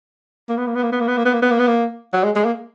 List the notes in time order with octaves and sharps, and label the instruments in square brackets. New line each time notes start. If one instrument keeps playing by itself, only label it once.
[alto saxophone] A#3
B3
A#3
B3
A#3
B3
A#3
B3
A#3
B3
A#3
B3
A#3
B3
A#3
F#3
G#3
G#3
A#3